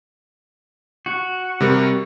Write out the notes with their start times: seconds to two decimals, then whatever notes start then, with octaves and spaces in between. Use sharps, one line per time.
1.06 F#4
1.60 C3 G3 A#4